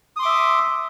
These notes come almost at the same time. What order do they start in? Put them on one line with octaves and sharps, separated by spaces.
D#6 C6 D6 E5